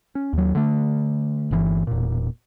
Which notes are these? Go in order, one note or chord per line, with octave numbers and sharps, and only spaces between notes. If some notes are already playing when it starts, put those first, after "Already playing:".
C#4
D#2 F#3
D3 A3
G1 C#3 E3
E1 A#2